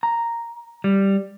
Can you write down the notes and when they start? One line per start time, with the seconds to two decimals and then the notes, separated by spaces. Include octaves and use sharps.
0.03 A#5
0.84 G3